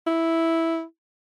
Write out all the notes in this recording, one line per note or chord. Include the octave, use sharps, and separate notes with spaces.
E4